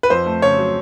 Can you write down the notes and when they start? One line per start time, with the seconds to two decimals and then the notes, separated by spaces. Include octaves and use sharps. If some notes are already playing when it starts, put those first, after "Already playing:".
0.03 B4
0.10 F2 C5
0.26 A3
0.42 C#3 C#5
0.58 F#3